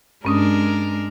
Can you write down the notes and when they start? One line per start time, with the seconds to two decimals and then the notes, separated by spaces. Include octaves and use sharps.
0.25 G2 G#3 C#4 D4 A#4 D#6